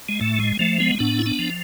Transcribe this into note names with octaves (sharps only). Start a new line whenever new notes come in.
G#3
A2 A3
G#3
F3 A3
G#3 B3
A2 B3 D4
E4
B3 D4
F3